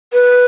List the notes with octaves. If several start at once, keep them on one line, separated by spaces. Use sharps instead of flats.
B4